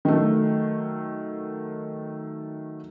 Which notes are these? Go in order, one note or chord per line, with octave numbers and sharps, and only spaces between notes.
D#3 F#3 A3